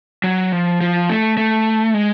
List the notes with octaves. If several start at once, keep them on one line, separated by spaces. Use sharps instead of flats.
F#3
F3
F3
A3
A3
G#3